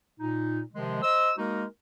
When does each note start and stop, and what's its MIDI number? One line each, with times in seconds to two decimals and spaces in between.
0.20 0.61 46
0.20 0.61 63
0.73 1.03 48
0.73 1.03 51
0.73 1.03 53
0.73 1.03 56
1.03 1.32 72
1.03 1.32 75
1.03 1.32 88
1.38 1.65 56
1.38 1.65 58
1.38 1.65 63
1.38 1.65 66
1.38 1.65 70